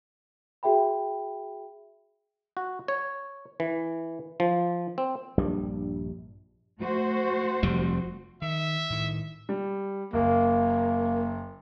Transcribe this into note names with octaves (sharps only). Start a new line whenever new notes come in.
F#4 G#4 E5 G5 B5
F#4
C#5
E3
F3
C4
A#1 G2 G3
A3 F#4 C5
F1 F2 G3
D#3 E5
A2 D#3
G3
F#1 A#3